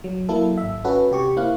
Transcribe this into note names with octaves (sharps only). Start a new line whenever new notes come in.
F#3
F#3 A#3 E4 A4
G#1 E5
C#4 F#4 A4 B4
C3 G4 C#6
A#3 C4 E4 F5 F#6